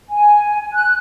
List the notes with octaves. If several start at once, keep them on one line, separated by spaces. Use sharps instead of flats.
G#5
F#6